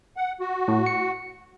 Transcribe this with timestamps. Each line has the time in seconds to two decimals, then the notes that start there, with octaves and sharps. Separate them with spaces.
0.17 F#5
0.40 F#4
0.68 A2
0.86 C#7